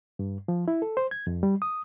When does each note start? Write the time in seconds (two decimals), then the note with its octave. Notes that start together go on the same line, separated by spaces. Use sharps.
0.19 G2
0.48 F3
0.68 E4
0.82 A4
0.97 C5
1.11 G#6
1.27 F2
1.43 G3
1.62 D#6